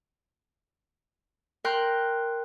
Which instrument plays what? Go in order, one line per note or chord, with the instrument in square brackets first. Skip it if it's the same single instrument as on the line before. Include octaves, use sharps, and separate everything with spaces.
[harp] A#4 G5 C6 F#6